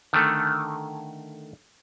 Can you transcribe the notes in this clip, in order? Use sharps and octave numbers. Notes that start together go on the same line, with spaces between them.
D3 D#3 A3